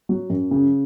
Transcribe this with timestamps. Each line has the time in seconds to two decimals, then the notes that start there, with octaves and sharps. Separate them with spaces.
0.09 F#3
0.30 F#2
0.51 C#3